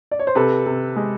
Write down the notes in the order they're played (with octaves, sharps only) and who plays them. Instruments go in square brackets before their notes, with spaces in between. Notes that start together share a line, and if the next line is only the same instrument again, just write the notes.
[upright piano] D5
C#5
C5
C3 A4 B4
C3
G#3